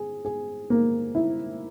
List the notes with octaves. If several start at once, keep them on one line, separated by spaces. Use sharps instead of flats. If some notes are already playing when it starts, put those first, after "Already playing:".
Already playing: G#4
G#4
A#3
E4